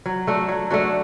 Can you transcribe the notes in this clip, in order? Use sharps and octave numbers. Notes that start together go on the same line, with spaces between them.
F#3
A3 D4 F#4
F#3
A3 D4 F#4